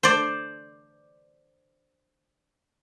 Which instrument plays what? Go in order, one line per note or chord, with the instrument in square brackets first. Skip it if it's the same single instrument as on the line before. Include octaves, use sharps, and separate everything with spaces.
[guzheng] C5 D5